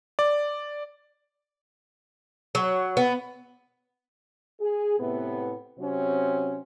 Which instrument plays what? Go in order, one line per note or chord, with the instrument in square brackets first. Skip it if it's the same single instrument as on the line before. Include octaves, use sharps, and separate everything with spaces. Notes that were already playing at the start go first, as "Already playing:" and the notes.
[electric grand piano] D5
[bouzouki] F#3
B3
[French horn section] G#4
A2 C3 B3
C3 F#3 C4 C#4